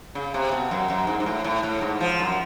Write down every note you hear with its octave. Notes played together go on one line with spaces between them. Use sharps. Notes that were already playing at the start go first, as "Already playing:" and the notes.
C#3
C3
B2
F#2
F#2
G#2
G#2
A2
A2
A2
G#2
F3
F#2